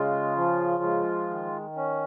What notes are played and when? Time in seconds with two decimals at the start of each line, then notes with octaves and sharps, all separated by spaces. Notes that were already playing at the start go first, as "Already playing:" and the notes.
Already playing: C#3 G#3 F4
0.36 F3
0.83 G#3
1.29 D#3
1.76 C#4